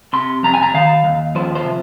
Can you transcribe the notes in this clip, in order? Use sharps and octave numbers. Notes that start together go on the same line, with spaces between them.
C3 C6
F2 A#5
G#5
A#5
D#3 F5
D#2
F3 C5
C5
C3